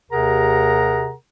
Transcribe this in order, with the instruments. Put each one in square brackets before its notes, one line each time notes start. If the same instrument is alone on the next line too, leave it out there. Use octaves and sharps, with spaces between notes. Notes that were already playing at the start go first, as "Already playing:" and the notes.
[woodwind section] D#2 C3 G#4 A#4 F#5 A#5